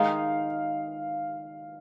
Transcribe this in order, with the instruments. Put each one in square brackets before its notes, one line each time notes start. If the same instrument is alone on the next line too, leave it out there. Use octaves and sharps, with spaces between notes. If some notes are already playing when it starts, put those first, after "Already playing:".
Already playing: [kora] D#3 G#3 D#4 [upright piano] F5